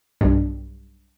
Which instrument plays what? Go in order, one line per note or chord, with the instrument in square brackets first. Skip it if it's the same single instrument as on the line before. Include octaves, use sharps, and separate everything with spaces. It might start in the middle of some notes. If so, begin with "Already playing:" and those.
[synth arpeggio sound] B1 G2